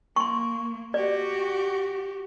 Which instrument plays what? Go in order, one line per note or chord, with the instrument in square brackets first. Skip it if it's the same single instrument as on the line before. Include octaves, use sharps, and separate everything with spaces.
[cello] A#3 [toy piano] C6 C#6
[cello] F#4 G4 [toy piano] D5